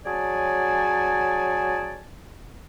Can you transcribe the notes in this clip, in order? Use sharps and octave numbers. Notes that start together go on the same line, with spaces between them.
F#3 C#4 G#4 D5 G#5 A5